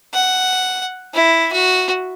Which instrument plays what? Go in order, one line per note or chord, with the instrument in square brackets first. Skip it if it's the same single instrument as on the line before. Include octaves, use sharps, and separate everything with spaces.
[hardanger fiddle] F#5
E4
F#4